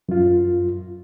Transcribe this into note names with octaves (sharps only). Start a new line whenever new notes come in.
F#2 F4